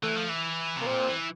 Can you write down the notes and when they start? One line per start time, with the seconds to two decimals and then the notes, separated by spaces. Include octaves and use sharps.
0.02 E3 A3
0.16 F3
0.29 E3
0.77 C3 A#3
0.86 A#2 C4
1.08 E3